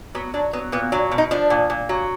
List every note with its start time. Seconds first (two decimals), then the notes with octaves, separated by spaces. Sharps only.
0.15 F#3 B3
0.34 F#3 D4
0.53 F#3 B3
0.72 A#2 B3
0.92 F#3 D4
1.11 B2
1.18 D#4
1.31 F3 D4
1.50 A#2
1.70 A#2
1.89 F#3